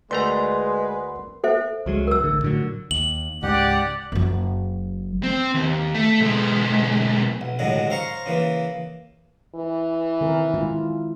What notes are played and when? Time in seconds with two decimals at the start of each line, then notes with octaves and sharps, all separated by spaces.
0.11 D2 G#3 A3 A#4 B4 F#5 A#5 C6
1.44 A4 C5 E5
1.86 C#2 F#3 G#3
2.07 A#4 E6
2.21 A1 D3
2.43 A2 D3 F#3
2.91 D#2 F#7
3.43 C#2 G#2 G4 D5 F#5
4.12 F#1 F#3
5.23 C4
5.54 D#2
5.95 A3
6.21 B1 G#3
7.41 B1
7.59 C2 A2 D3 D#3 F#3 G#3
7.90 C5 F5 A#5 C6 C#6
8.26 C#3 E3 A#3
9.55 E3
10.21 D#3 C4 A#4
10.54 G#3 E4 F4